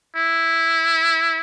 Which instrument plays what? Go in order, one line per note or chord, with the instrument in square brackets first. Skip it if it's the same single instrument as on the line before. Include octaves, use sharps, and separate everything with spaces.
[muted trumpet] E4